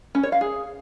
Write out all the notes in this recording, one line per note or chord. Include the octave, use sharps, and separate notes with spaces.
C#4
C#5
F5
G#4